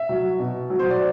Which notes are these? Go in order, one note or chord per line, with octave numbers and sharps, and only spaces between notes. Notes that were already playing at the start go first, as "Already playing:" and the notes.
Already playing: E5
F#3
B2
F#3
C5
D5